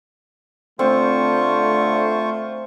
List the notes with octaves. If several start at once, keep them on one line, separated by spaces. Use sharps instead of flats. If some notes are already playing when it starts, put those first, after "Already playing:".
D3 A3 C4 F4 C5 C#6